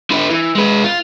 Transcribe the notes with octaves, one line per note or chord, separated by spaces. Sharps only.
D3 B4
E3
G#3 B4
F4